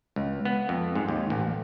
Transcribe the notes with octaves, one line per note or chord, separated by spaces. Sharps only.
C#2
B3
F2
G#2
D#2
A1